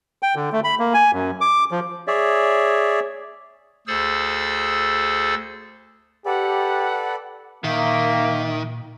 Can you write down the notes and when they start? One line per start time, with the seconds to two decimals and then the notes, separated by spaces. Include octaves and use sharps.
0.23 G5
0.35 D3
0.52 A3
0.64 B5
0.79 A#3
0.94 G#5
1.13 F#2
1.41 D6
1.71 F3
2.07 G#4 C#5 D5 E5
3.87 D2 G#4 A4 C5 E6 A6
6.26 G4 A4 B4 D5 F#5
7.64 A#2 D#3 A#3 E5